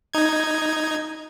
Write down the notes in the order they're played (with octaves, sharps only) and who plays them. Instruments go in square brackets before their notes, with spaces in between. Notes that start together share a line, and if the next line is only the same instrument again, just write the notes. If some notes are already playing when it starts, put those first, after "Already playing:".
[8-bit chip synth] D#4 G#6